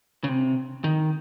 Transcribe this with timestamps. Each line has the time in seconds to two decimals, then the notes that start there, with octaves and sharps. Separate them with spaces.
0.24 C#3
0.29 C3
0.84 D#3